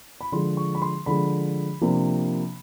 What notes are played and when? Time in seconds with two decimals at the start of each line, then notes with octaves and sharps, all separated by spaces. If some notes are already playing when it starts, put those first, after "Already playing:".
0.21 B5
0.32 D3 F3 G#3 C6
0.57 C#6
0.75 B5
0.82 C6
1.06 D3 F3 G#3 B5
1.81 C3 F3 A#3 D4